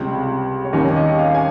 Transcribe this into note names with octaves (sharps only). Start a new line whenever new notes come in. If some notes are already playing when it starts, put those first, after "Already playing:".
Already playing: C#2 C3 G3
C#5
D#2 D#3 G3 C#4 D#5
D#5
F5
G#5